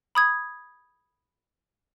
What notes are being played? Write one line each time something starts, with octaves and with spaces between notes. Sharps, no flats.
B5 D#6 G#6